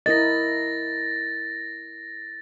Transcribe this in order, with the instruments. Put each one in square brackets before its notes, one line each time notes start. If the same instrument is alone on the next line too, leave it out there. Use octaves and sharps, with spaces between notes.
[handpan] E4 A#4 D#5 [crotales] A6 A#6